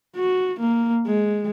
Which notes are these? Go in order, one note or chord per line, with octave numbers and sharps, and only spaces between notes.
F#4
A#3
G#3